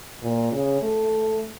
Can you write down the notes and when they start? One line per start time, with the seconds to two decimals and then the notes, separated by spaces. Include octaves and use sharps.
0.23 A#2
0.52 C#3
0.82 A3